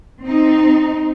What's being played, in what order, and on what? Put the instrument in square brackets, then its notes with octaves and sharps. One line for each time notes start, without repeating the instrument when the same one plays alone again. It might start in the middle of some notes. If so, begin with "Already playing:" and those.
[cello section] C4 D#4